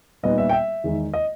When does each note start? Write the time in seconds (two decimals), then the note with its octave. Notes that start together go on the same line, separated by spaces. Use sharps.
0.23 A#2 G3 B3 D#4 D#5
0.38 E5
0.50 G5
0.53 E5
0.84 E2 D#3 G#3 D#4
1.14 D#5